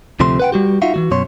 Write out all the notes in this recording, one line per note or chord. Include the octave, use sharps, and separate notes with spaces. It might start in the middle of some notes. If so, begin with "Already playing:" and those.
D2 C3 F3 A3 C6
B4 F#5 G5
G3 F#4 G4
D#4 F4 F#4 E5 F5
E3 F#3 F#4
F#2 B2 C#5 C6